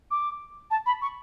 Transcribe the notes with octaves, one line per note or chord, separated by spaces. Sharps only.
D6
A5
B5
C#6